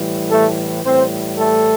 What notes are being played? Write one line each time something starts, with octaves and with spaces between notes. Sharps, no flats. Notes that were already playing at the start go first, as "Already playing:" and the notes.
Already playing: A2 E3 G3
A3 A4
A2 E3 G3 C4 C5
A3 A4